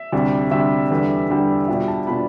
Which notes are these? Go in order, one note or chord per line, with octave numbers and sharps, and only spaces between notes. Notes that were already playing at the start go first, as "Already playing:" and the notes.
Already playing: E5
D2 C3 G3 D4
D2 C3 G3 D4 E5
E2 D3 G3
E2 D3 G3
B2 G3 D4 F4 E5
A5
B2 G3 D4 F4 B5